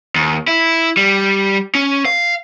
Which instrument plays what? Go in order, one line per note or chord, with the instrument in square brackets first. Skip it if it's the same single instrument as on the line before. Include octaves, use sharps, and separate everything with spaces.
[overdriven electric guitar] D#2
E4
G3
C#4
F5